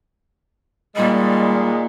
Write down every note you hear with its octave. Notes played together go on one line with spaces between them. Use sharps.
A#2 D#3 G3 G#3